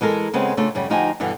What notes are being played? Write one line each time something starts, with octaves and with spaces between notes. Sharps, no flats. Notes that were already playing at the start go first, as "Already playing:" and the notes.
E3 G#3 A4 A#4
C#3 G#3 B3 C4
C#3 A3 D4 F4 A4
F#2 C#3 G3
D2 F3 D#4 F#4 G4 G#5
G2 B2 D3 E3